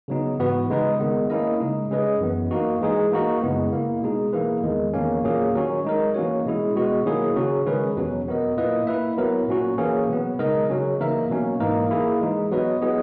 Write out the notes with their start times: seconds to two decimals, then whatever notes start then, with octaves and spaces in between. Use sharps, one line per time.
0.08 C#3 F#3 B3 D#4
0.39 G#2 E3 B3 F#4 B4
0.69 C#3 G#3 D#4 G#4 B4
1.00 D#3 G#3 B3
1.30 A#3 C#4 E4 A#4 D#5
1.60 C#3 G#3 D#4
1.91 G#3 C#4 G#4 B4 D#5
2.21 F#2 E3 B3
2.51 A#3 D#4 F#4
2.81 E3 G#3 D#4 G#4
3.12 A#3 D#4 F#4 A#4
3.42 F#2 C#3 G#3 B3 E4
3.72 A#3 E4 A#4
4.02 B2 G#3 D#4 G#4
4.33 E3 A#3 E4 G#4 B4
4.63 E2 D#3 G#3
4.93 E2 D#3 A#3 C#4
5.24 A#2 F#3 A#3 C#4 G#4
5.54 D#3 F#3 C#4 F#4
5.84 G#3 D#4 A#4
6.14 E3 A#3 C#4 F#4 C#5
6.45 B2 G#3 C#4 E4 G#4
6.75 B2 G#3 B3 F#4
7.06 D#3 F#3 A#3 E4 G#4
7.36 C#3 F#3 C#4 F#4
7.66 D#3 G#3 C#4 G#4 B4
7.97 E2 B2 F#3 C#4 F#4
8.27 F#3 B3 F#4 A#4 D#5
8.57 A#2 A#3 E4 B4 D#5
8.87 A#3 E4 B4 E5
9.18 F#3 B3 E4 A#4
9.48 A#2 F#3 C#4 F#4
9.78 E3 A#3 C#4 E4 G#4
10.08 B2 F#3 B3
10.39 C#3 G#3 D#4 A#4 D#5
10.69 C#3 F#3 C#4
10.99 E3 A#3 D#4 A#4 E5
11.30 B2 F#3 A#3 C#4
11.60 G#2 E3 A#3 D#4 A#4
11.90 A#3 E4 G#4
12.21 E3 G#3 D#4
12.51 F#3 B3 F#4 B4 D#5
12.81 F#3 B3 E4 G#4 D#5